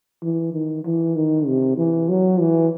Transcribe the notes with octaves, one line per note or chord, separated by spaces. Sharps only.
E3
D#3
E3
D#3
C3
E3
F#3
E3